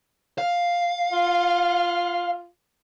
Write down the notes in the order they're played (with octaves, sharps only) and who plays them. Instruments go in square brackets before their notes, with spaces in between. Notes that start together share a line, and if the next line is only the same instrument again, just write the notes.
[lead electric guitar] F5
[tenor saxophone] F4